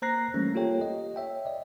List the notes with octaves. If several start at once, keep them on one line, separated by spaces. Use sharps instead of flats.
A#3 C5 A#5 F#6 A#6 C7
E3 G3 A3 A#3 C#4
A#3 F4 G4 A4 C#5 G5
D#5
C#5 E5 G5
D5 D#5